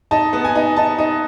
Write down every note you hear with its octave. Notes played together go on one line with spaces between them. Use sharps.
D#4 A5
B3
G#5
D#4
D#4 A5
D#4